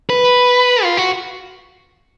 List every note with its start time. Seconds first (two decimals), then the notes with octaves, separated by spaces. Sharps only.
0.10 B4
0.83 F4
0.97 F#4